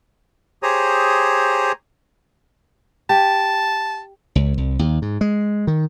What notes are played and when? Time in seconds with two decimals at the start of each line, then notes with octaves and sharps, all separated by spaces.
0.63 G4 G#4 C5 C#5 A#5 D#6
3.09 G4 A5
4.35 C#2
4.58 C2
4.79 D#2
5.02 G#2
5.21 G#3
5.67 D#3